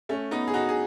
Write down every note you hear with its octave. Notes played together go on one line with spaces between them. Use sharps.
A3 C#4
B3 D#4
G#4
D#4 F#4
G#4